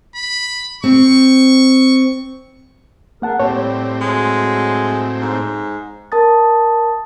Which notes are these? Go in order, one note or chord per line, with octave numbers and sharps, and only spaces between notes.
B5
C4 C#6
A#3 G#4 A#4 F#5 A5
A2 G3 C4 G4 C#5
F#3 G#3
G#2
A#4 A5 D#6 A6